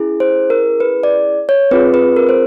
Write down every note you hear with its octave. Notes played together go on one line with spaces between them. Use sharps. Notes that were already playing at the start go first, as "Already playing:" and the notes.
Already playing: C#4 E4 G#4
C5
A#4
B4
D5
C#5
C4 F4 G#4 B4
B4
A#4
C5